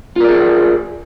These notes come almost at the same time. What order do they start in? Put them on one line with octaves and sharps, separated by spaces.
F4 A#4 D5 G#4